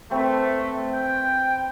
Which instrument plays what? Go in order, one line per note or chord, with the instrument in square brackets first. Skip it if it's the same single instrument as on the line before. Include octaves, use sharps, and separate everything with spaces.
[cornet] A3 [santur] C4 B4
[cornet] G5